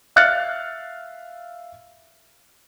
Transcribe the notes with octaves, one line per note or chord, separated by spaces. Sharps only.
E5 F5 F6 F#6 A6 C#7